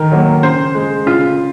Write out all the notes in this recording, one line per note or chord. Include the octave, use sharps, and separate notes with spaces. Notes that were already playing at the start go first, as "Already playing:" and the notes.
Already playing: D#3 A#4
F#3 A#3
C#3 C5
G#3
C#3 F4